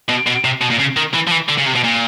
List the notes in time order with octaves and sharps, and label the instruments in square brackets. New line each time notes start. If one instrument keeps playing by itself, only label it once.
[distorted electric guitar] B2
B2
C3
B2
A#2
C#3
D#3
E3
F3
E3
D3
C#3
C3
B2
A#2